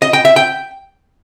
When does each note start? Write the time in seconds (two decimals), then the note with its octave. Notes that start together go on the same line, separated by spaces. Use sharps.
0.02 D#5
0.13 G5
0.25 E5
0.36 G5